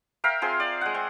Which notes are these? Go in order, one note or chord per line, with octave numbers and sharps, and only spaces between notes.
A#4 E5 F5 G5
C4 F4 G#4 C5
D5
G#3 F#5
C4